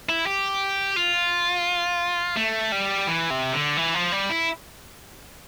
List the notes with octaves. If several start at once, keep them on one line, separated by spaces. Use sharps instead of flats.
E4
G4
F4
A3
G3
E3
C3
D3
E3
F3
G3
E4